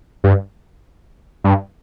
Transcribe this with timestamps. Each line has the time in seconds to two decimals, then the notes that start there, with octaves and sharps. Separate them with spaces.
0.24 G2
1.44 G2